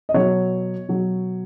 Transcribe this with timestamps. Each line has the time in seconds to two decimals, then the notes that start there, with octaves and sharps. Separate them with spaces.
0.09 D#5
0.14 B2 F#3 C#5
0.89 B2 F#3